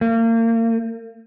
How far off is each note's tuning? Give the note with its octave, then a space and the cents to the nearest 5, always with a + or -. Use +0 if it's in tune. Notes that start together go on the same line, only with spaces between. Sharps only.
A#3 -35